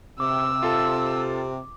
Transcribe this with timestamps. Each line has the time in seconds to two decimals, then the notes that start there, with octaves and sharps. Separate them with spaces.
0.20 C3 D6 E6
0.63 F4 A4 A5